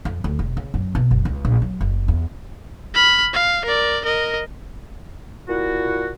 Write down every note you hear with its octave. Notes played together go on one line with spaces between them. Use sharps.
F2
D2
E1
C#3
F#2
B2
F#1
C#2
A#1
F#3
F#1
E2
B5 F6
F5
A#4 D5
A#4 D#5
A#2 E4 F#4